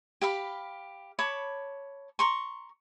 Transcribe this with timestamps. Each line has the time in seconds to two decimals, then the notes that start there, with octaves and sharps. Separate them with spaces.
0.21 G4 F5 B5
1.19 C#5 A5 B5 D6
2.19 A#5 C6 C#6